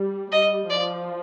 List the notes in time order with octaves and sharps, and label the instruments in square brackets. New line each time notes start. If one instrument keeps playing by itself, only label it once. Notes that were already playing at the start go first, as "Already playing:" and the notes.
Already playing: [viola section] G3
[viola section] G3 [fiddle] D#5
[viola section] F3 [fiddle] D5